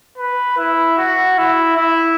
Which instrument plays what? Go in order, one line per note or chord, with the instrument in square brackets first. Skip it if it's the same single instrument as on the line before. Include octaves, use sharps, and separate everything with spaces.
[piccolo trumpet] B4
E4
F#4
E4
E4